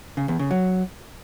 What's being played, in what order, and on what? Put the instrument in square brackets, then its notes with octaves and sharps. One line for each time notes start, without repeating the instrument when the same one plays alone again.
[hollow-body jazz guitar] C#3
E2
C#3
F#3